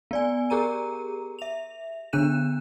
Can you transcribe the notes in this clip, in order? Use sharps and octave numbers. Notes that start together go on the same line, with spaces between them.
B3 D5 G#5
G4 G#4 A#4 A#5 D#7
E5 F7
D3 B3 D4 F#6 D#7 E7